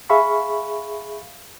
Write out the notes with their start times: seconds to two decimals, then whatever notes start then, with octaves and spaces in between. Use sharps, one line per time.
0.10 G#4 E5 F5 B5 C#6